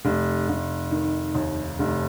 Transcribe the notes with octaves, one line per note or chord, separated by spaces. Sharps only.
F1
F1
D#3
D#2
F1